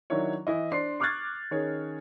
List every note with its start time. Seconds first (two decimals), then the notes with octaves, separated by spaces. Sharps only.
0.10 D#3 F#3 D4 E4 C#5
0.47 E3 E4 D#5
0.72 D4 C5 C6 C7
1.00 C#6 D6 F6 F#6 G#6 A6
1.51 D#3 C#4 G#4 C#5